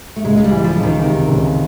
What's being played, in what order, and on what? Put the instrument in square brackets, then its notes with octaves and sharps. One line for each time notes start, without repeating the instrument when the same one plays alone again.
[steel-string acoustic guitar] A3
[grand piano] C#2 [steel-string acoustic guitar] G#3
[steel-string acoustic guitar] G#3
G3
[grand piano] E3
[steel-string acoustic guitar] F3
[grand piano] C#2
[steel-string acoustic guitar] D#3
[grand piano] C3 [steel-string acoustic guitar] D#3
[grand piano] C#2